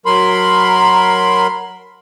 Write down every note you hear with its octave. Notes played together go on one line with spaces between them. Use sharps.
F#3 A#4 B5 C6